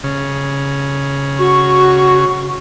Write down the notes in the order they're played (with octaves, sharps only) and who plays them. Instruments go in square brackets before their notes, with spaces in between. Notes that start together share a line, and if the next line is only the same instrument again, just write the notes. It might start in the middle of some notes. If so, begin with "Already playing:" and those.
[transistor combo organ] C#3
[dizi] F#4 [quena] C#6